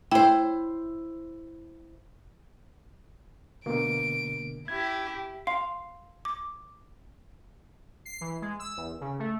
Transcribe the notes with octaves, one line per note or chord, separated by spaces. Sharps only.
E4 C5 G5
B2 D3 A#3 D7
E4 G4 G#6
F5 C6
D6
C7
E3
G#3
E6
E2
C#3
A3